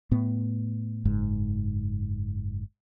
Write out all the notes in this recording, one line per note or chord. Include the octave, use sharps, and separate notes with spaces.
A2 B3
F#1 G#2